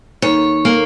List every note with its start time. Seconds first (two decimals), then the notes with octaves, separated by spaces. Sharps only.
0.22 D#2 C#5
0.65 A#3